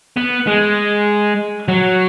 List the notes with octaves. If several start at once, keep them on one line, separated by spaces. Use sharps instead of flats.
B3
G#3
F#3